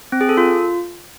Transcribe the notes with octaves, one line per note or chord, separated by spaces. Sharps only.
C4
G#4
A4
F4